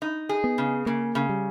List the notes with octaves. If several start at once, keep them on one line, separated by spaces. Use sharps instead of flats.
D#4
G#4
B3
C#3
C#3 A#3
C#3
G3